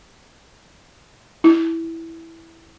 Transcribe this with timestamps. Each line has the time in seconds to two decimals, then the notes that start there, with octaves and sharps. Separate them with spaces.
1.44 E4